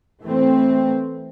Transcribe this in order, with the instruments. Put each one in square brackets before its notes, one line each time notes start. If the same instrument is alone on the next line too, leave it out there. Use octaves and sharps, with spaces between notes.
[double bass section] E3 A3 C4